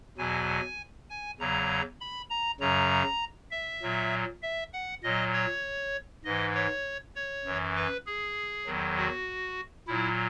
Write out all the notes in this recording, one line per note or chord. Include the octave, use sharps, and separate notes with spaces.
E2 B2 F#3 G#5
G#5
E2 C#3 F#3 A#5
B5
A#5
F#2 C#3 F#3 A#5
E5
A#2 F#3
E5
F#5
A#2 F#3 D#5
C#5
G#2 E3 D#5
C#5
C#5
F#2 E3
B4
G#4
E2 D#3 F#3
F#4
A#2 F#3 E4